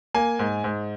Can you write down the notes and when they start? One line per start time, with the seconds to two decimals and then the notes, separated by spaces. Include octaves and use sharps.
0.15 A#3 G#5
0.39 G#2
0.64 G#2